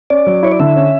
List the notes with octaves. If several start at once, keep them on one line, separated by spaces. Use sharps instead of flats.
C#4 D5
F#3
E4 C#5
D5
D3 E5
C#4